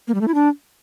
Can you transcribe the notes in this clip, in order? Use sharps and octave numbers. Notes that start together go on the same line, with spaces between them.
A#3
G3
A3
E4
D4